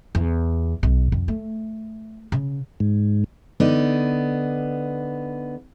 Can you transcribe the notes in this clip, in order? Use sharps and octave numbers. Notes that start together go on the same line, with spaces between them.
E2
B1
F2
A3
C#3
G#2
D3 B3 D#4 D5